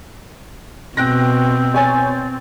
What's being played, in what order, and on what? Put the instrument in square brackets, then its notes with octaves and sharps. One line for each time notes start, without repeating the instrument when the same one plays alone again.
[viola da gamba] B2 [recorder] C4 [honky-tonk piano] G5 F#6 A#6
[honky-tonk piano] C#5 G#5 A6